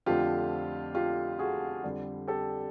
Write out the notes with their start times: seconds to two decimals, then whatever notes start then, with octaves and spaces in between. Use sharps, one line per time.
0.06 F2 D3 F3 A3 F4 G4
0.95 F4 G4
1.39 F#4 G#4
1.84 F2 D3 G3
2.28 G4 A4